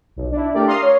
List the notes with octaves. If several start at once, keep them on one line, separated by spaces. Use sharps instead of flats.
B1
D4 E4
A3 D4 G4 A#4 D5
F5 A#5 C6 D#6
C#5